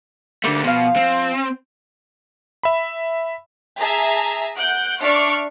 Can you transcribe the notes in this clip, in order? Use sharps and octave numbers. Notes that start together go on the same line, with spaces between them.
D3 G3 A3 A#3
B2 F3 F5
C4
E5 B5
G#4 E5 A5 A#5
F#5 F#6 G6 D7
D4 D5 E5 C#6 F6